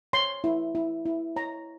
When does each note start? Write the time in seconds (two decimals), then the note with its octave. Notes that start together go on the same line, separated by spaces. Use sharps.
0.13 C#5 C6
0.44 E4
0.75 E4
1.05 E4
1.36 C#5 A#5